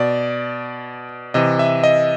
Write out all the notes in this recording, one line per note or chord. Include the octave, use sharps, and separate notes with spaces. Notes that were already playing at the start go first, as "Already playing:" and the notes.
Already playing: B2 D5
C3 E3 D#5
E5
D#5